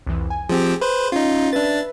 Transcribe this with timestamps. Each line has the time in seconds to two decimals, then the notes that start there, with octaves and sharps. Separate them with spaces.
0.07 C2 F2 E3
0.30 G#5
0.49 F3 C4 G4 G#4
0.81 B4 C5
1.12 C#4 D#4 F4
1.53 D4 B4 E5 A6